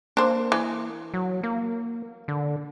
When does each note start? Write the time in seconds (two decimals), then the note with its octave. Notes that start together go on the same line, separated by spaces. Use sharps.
0.17 A#3 D4 C5
0.52 E3
1.14 F#3
1.43 A#3
2.28 D3